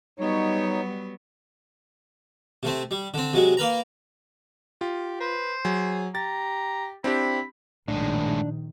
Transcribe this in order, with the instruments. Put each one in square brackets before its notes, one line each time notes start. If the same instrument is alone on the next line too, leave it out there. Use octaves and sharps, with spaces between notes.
[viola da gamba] F#3 B3 [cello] G3 [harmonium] D#4 C#5
[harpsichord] C3 A3 C4
G3
D3 C4
C3 F#3 G#3
A#3 A#4 B4 A#5
[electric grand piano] F4 [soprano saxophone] G4
[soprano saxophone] B4 [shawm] C5
[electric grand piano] F#3 [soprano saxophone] G#4
[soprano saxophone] G4 [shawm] A#5 [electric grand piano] A6
[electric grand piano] C4 D4 G4 [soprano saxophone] E4 [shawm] B5
[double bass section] A#1 D#3 [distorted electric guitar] A2 G#3 [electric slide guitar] D4